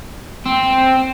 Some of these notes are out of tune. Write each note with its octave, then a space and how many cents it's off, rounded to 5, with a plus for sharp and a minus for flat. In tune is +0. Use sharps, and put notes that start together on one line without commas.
C4 +0